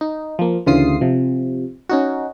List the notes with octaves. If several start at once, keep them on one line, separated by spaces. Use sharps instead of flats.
D#4
F3 A#3
D2 C#3 E3 F4 D#6 C7
C3 F3
C#4 D#4 F#4